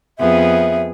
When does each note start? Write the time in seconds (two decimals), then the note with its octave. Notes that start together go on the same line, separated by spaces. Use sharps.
0.19 F2 B3 G#4 E5